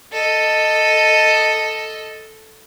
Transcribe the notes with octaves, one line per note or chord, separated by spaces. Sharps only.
A4 D#5